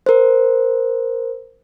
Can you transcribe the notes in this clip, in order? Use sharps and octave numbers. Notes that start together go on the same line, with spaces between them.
A#4 C5